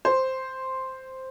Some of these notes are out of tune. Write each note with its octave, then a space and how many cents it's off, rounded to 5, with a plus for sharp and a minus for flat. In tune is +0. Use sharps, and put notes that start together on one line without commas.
C5 +0